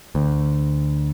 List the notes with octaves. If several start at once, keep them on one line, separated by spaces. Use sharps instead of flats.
D2